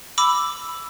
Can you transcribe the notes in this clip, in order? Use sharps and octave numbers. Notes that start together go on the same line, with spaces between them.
B5 D6 E6